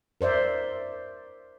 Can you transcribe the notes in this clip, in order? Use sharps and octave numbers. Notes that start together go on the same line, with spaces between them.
A#4 C5 D5 E5